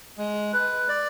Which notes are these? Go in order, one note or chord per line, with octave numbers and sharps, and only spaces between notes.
G#3
B4
D5